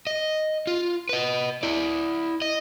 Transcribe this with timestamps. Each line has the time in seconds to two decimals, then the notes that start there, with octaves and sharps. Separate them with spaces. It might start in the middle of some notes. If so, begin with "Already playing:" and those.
0.07 D#5
0.67 F4
1.09 B4 D#5
1.63 E4 D5
2.42 D#5